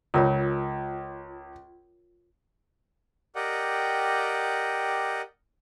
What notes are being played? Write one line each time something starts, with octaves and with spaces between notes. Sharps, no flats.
C#2 F4 A#4 C#5
G4 A#4 D5 D#5 F#5 G5